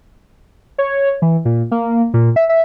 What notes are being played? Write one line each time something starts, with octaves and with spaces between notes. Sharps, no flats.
C#5
E3
A#2
A#3
A#2
E5
E5